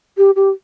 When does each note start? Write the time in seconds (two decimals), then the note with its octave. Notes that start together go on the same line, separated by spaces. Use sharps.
0.18 G4
0.36 G4